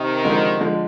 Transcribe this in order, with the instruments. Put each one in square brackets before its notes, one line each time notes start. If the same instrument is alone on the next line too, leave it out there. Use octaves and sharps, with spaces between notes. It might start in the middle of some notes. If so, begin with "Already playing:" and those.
Already playing: [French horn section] C3 D#3
[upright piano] D3 F3 G#3
D3 F3 G#3